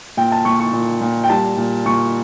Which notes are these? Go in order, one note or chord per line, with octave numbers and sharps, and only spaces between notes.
A#2 G5
A5
A#2 C#6
C#6
A#2
A#2
G5
G3 A5
A#2
A#2 C#6